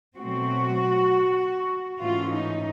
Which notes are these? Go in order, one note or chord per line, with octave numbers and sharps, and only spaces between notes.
B2 F#3 A3 C4 F#4
G#2 E3 A3 C#4 F4
D#4